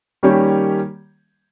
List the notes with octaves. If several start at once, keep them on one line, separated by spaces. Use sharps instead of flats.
D#3 G3 A#3 C#4 G4